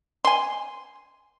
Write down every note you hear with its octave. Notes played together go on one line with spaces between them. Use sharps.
G#5 C6